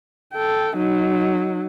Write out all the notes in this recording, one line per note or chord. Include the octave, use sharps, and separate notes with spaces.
A4 G5
F#3 D#4